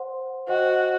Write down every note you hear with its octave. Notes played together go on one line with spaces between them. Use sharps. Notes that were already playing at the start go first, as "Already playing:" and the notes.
Already playing: C5 F#5 C6
F#4 C5 D#5 G5